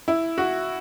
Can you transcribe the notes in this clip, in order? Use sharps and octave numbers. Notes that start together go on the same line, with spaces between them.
E4
F#4